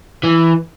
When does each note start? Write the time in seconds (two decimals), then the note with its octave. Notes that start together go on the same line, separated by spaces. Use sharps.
0.23 E3